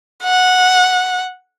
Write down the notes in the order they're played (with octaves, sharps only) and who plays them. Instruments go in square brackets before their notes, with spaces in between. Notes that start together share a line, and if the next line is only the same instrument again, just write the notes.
[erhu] F#5